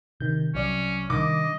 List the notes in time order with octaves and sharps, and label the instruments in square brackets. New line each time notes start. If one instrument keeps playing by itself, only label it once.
[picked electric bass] C3 [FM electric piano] D#3 G6
[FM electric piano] C2 D5 [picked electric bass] F#3 [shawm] C#4
[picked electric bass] C3 G3 D4 [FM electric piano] D#3 [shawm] D#5 [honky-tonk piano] D6